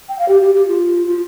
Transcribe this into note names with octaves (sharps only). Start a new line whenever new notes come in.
G5
F5
G4
G4
G4
F4
F4